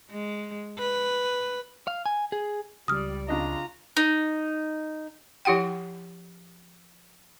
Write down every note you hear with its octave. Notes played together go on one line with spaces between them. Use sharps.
G#3
B4
F5
G#5
G#4
C#2 G3 D5 D#6 F6
C#3 D4 F4 D#5 A#5
D#4
F3 E4 G4 F#5 G5